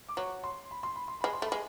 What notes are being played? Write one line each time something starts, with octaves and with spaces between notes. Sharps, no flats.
D6
F#3 C#6
C6
B5
C6
B5
C6
G#3 B5
C6
A3
B5
G#3